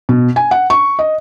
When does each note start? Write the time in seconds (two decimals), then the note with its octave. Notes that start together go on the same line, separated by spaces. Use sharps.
0.09 B2
0.36 G#5
0.51 F#5
0.70 C#6
0.99 D#5